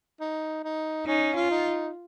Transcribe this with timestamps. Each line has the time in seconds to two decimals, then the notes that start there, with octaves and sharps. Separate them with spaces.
0.20 D#4
0.64 D#4
1.07 C#4 D#4
1.36 F4
1.51 D#4